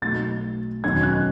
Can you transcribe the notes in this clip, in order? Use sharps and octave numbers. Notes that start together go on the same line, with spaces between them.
B1 B2 A3 A6
E1 E2 D#3 F#3 C#4 G#6
F#6